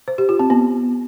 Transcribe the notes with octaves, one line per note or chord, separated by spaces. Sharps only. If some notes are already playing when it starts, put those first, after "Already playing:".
C5
G4
F4
C4
B3